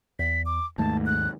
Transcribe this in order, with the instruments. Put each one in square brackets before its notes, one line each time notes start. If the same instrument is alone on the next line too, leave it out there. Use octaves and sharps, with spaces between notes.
[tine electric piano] E2 [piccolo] B6
[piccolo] D6
[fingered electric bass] D#2 G#2 [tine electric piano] A3 A#3 [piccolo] A5
[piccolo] F#6